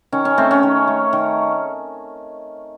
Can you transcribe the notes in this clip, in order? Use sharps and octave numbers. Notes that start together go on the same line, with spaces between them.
D#3 C#4
C#4
A3 C4
C#4
D#3
A3
D#3